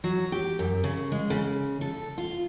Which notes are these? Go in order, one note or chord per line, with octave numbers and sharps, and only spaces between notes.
F#3
G4
F#2
C#3
G#3
C#3
A4
F4